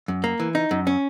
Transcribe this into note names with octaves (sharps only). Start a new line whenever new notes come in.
F#2
A#3
E3
D#4
F#2
C#4